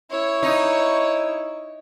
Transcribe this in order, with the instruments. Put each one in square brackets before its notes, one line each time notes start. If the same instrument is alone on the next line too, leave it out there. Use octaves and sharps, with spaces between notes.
[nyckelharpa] E4 C#6 [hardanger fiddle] C#5
[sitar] D#4